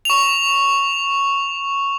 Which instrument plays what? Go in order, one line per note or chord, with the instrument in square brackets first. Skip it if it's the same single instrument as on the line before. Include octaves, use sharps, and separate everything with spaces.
[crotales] C#6 F7